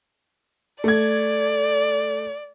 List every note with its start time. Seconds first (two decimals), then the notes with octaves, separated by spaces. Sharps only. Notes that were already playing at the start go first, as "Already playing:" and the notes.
0.84 A3 D5 G#6